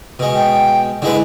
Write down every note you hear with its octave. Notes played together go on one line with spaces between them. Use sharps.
B2 G#3
G5
D3 G#3 E4 B4